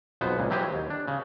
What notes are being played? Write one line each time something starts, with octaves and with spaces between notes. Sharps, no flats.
B1 F2 B3 C5
C#2 A#2
E3 F#3 G4 G#4 C5
D#2
D4
C#3